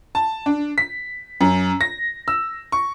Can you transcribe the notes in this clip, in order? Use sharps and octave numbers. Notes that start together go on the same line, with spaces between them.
A5
D4
B6
F#2
A#6
E6
C#6